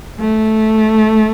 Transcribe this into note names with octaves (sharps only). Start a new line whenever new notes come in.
A3